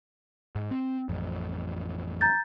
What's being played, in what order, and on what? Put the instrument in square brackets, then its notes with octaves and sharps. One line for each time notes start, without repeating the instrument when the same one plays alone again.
[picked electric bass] G#2
C4
A1 F2
[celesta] A#5 G6 A6